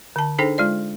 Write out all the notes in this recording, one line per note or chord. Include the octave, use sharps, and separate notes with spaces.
D3 A5
D4 D#4 G#4 A4 C5 G5
G#3 F4 D5